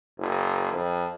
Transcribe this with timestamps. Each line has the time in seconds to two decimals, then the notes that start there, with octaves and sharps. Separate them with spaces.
0.18 F#1
0.73 F2